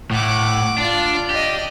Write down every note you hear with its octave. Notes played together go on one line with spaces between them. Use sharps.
A2 F#5 D6
D4 F4 D5
G4 D5 D#5